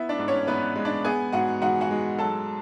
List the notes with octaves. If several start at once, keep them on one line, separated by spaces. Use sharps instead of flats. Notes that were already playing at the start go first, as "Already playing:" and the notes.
Already playing: B3 E4 E5
D4 D5
G#2
C#4 C#5
G#2 B3 B4
G#3
D4 D5
B3 G#4 G#5
G#2 F#4 F#5
G#2 F#4 F#5
F#4 F#5
G#3
F#3 A4 A5